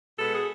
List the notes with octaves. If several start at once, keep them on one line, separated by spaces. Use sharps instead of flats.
B2 G#3 B3 A4
G#4